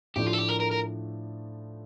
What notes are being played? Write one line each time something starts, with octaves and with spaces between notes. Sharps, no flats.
A2 F3 A3 D4 G4
F4
A4
G4
A#4
A#4
A#4